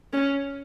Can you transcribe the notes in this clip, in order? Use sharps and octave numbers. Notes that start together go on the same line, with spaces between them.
C#4